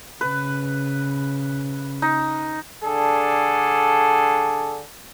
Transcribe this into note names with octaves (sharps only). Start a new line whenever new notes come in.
C#3 B4
D#4
D3 D4 G#4 A4